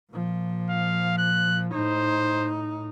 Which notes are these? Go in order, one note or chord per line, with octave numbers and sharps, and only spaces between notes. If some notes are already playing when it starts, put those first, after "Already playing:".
A#2 F3
F5
F#6
A2 D#4 C5